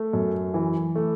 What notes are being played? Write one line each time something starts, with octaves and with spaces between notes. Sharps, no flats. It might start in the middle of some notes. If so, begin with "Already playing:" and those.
Already playing: A3
F#2
E3
A3